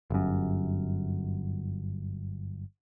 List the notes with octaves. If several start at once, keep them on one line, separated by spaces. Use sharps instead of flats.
G1 F#2